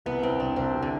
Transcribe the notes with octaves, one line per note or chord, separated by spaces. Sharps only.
C2 B3
C2 C4
C2 D4
C2 C4
C3
D3